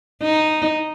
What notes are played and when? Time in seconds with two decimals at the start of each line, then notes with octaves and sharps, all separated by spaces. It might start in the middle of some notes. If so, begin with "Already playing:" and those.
0.23 D#4